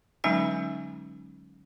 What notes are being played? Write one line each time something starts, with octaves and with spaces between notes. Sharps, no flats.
D3 F#3 G#3 C#4 D#4 G#5